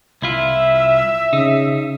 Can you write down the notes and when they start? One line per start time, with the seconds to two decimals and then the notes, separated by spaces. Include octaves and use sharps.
0.22 C2 E4 F4 E5
1.33 C#3 D#4